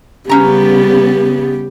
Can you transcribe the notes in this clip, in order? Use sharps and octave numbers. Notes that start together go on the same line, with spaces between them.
C#3 G3 B3 C#4 G4 A#5